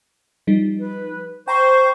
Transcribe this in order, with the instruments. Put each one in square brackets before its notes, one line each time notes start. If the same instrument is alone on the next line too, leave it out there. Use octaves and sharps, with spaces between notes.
[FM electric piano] F3 G3 D#4
[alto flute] B4
[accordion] C5 [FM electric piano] G5 A#5 [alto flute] C#6